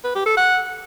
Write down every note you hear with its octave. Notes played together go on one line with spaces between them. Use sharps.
B4
G4
A4
F#5